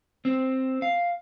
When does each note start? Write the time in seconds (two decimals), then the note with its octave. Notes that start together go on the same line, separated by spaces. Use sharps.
0.25 C4
0.82 F5